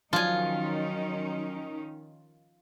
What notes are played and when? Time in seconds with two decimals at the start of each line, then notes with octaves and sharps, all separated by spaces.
0.13 D#3 F3 F#3 C#4 D#4 F4 G#5